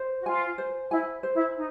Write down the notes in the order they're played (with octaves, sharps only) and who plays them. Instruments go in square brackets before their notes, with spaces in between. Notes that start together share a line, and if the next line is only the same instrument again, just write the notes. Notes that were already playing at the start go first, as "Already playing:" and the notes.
Already playing: [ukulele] C5
[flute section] F#4
[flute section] F4 [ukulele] G#5
[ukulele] C5
[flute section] E4 [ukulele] G#5
[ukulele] C5
[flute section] E4
D#4